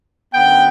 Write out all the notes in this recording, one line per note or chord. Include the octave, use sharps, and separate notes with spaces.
F#2 D3 F#3 B3 G5